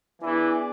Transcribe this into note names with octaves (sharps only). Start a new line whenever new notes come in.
E3 B3 D4 G#4 D5